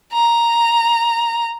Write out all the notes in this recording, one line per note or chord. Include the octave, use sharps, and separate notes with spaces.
A#5